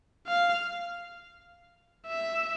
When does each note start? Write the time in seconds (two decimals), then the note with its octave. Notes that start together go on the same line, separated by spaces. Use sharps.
0.27 F5
2.08 E5